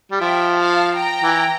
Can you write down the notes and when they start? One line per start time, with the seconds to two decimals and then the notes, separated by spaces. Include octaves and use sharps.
0.11 G3
0.20 F3 E5 G5
0.60 F5 A5
0.97 G5 A#5
1.23 E3